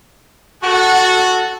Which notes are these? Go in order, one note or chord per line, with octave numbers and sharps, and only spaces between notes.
F#4 A4 F#5